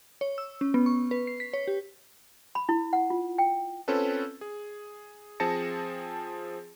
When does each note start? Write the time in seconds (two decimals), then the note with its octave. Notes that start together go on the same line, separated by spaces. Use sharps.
0.21 C#5
0.38 E6
0.61 C#4
0.74 B3
0.86 C#6
1.11 B4
1.27 C7
1.40 B6
1.53 C#5
1.68 G4
2.55 B5
2.69 E4
2.93 F#5
3.10 F4
3.38 G5
3.88 C4 C#4 F4 A4 B4
4.41 G#4
5.40 F3 C4 G#4 A5 A#6 C#7